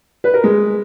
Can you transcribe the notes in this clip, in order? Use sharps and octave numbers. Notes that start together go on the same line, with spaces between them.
B4
A#4
G#3